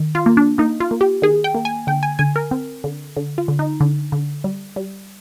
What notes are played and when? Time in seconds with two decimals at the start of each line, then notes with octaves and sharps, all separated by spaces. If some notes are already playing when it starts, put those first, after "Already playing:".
Already playing: D#3
0.15 F4
0.26 A#3
0.37 D4
0.58 A#3 D#4
0.80 F4
0.91 A#3
1.01 G4
1.22 D#3 G#4
1.44 G5
1.55 A#3
1.65 G#5
1.87 D3 G5
2.03 G#5
2.19 D3 G#5
2.36 A#4
2.51 C4
2.84 D3
3.17 D3
3.38 F4
3.48 D3
3.59 D#4
3.81 D3
4.12 D3
4.44 G3
4.76 G3